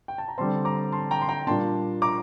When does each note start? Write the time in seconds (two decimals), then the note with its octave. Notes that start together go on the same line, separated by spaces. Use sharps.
0.08 G5
0.18 A5
0.28 A#5
0.38 D3 G3 C4 A5 C6
0.65 A#5 D6
0.92 A5 C6
1.11 G5 A#5
1.22 C6
1.29 G5 A#5
1.47 A#2 G3 A#3 D4 A5 C6
2.02 A#5 D6